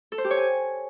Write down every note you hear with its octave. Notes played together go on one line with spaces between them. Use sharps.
A4
C5
G4
C#5
G#5